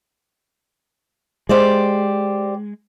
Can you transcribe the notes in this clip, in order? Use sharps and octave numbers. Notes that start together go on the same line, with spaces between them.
G#3 G4 C5 D5